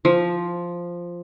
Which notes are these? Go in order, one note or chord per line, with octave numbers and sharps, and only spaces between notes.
F3